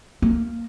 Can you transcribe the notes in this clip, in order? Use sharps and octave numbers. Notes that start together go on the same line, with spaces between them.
A#3